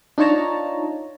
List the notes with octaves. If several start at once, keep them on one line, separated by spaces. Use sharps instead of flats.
D4 D#4 F4 C#5 A5 A#5